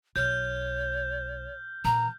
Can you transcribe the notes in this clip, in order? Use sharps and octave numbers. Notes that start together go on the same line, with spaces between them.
B1 C#5 F6 G6
A#2 E3 A#5